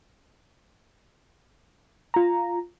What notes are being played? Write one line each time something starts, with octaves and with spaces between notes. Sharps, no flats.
F4 A#5